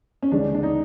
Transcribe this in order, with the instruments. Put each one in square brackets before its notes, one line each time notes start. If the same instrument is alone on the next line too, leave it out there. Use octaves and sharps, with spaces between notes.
[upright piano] C#4
[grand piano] D2 C#3 E3 G#3 [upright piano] D4
[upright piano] D4
D#4